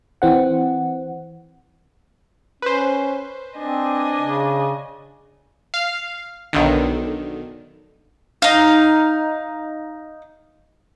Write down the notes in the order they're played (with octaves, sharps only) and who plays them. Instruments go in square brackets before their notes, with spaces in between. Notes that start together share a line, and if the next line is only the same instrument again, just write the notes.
[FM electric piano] E3 C4 F#5
[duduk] C#4 [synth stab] B4 C5
[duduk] C4 [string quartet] D4 D#5 G#5
[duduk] C#3
[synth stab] F5
B1 D3 D#3
[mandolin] D#4 F5